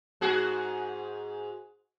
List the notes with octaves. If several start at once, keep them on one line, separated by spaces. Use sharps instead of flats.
G#2 F#4 G#4